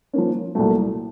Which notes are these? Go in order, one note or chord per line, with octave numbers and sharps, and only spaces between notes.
F3 A#3 C#4
C2 A#2 F#3 A3